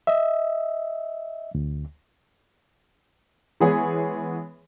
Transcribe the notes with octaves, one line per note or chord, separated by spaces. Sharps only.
D#5 E5
D2
E3 G#3 B3 G#4 C#5